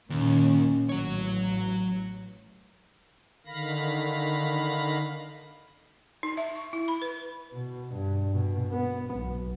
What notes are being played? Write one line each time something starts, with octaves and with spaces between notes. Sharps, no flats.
D#2 A#2 D#3 C#4
A1 F#3 C#5
D3 D#3 F5 B5 A#6
D#4
E5
C#6
E4
B5
B4
B2
G2
B2
B3
B1